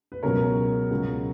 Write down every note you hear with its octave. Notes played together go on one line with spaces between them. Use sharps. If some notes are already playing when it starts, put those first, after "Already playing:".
B4
C#2 B2 F#3 A#4 C#5
C#2 B2 F#3